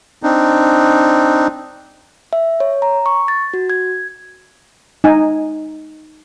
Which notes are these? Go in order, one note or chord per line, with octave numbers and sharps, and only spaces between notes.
C4 D4 D#4
E5
C#5
A#5
C#6
A6
F#4
G#6
D#4 G#5